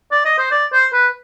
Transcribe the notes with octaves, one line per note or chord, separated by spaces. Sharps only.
D5
D#5
C5
D5
C5
B4